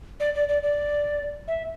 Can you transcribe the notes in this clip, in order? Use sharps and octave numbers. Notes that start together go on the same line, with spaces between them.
D5
D5
D5
D5
E5